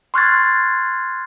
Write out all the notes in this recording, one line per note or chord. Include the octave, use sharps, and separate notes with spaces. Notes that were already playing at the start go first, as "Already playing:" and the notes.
C6 C#6 F6 F#6 G#6 A6